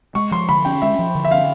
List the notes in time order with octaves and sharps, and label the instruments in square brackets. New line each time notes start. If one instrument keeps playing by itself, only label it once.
[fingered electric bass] G#3 [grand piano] C#6
[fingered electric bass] F3 [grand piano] C6
[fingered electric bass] D3 [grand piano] B5
[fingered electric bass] C#4 [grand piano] G5
[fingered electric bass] G#3 [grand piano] E5
[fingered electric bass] F3
D3
[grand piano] E5
[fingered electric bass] C#4 [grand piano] F5